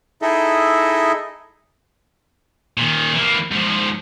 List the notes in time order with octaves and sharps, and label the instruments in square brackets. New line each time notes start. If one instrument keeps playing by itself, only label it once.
[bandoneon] D#4 E4 G#4 A4 D#5 E5
[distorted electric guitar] A#2 D#3
E3 A#3
G#2 F3